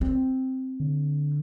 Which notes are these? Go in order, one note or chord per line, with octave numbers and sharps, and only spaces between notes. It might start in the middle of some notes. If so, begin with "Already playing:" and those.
C4
D3